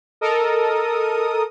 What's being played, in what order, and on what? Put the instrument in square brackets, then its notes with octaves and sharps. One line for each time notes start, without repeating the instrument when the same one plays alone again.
[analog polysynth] A4 A#4 D#5 D#6